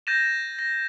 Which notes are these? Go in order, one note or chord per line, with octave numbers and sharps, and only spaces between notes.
G6 A6 A#6 D#7 E7
A#6